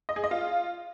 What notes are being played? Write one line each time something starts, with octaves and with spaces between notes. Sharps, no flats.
D#5
G#4
D#5
F4